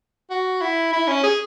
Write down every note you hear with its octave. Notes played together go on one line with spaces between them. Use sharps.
F#4
E4
E4
C#4
G#4